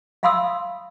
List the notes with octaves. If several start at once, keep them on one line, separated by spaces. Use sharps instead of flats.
E5 F5 B5 C6 D#6 E6